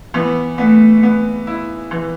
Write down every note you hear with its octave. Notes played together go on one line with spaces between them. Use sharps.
E3 B3
A3 B3
B3
E4
E3